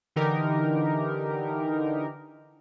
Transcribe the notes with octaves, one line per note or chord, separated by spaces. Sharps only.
D3 E3 D#4 G4 A#4